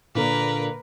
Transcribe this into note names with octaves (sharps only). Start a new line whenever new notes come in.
A#2 D3 A#3 A#4 B4